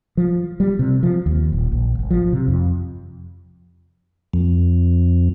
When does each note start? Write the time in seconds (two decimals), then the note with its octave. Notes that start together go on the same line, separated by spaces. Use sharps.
0.17 F3
0.60 G3
0.79 C3
1.03 F3
1.26 D#2
1.52 D#1
1.72 A#1
1.99 G#1
2.11 F3
2.32 C3
2.48 F2
4.33 F2